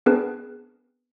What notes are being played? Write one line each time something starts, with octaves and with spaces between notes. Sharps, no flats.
B3 C4 D4 G#4 A#4 B4